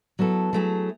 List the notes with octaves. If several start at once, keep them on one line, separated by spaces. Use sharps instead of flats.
F#3 B3 E4 A4
F#3 A3 E4 G#4